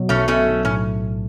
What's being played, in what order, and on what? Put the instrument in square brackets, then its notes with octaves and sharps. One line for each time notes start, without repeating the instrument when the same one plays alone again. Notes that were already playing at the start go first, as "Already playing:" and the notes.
Already playing: [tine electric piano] B2 F#3
[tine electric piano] B1 [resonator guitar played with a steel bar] A3 C#4
[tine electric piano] B2 [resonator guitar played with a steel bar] A3 C#4
[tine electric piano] B1
[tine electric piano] A2 [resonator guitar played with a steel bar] C#4